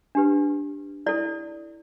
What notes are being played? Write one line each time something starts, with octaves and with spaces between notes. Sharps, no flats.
D4 G4 B4
E4 A4 D5